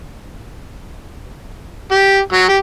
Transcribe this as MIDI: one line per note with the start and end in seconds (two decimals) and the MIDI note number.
1.91 2.19 67
2.33 2.46 54
2.49 2.57 67